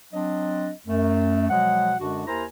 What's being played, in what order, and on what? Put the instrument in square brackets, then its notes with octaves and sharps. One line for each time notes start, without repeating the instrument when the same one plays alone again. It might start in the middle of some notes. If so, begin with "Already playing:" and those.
[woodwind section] F#3 C4 D4 D#5
F#2 A3
B2 F3 F#3 G#3 F#5
F#2 D3 G#3 D4 F#4
D#2 E4 A#4 C5 G#5 A#5